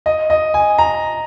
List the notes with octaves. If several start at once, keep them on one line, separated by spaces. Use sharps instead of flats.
D#5
D#5
G#5
A#5